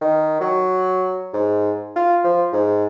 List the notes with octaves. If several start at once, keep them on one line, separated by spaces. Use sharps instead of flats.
D#3
F#3
G#2
F4
F3
G#2